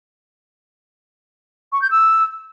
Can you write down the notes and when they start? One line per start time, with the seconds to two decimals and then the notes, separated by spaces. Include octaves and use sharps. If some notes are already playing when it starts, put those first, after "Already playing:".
1.73 C#6
1.82 G6
1.91 E6